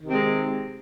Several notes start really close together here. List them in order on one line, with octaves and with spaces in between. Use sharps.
D#3 C3 C4 G#3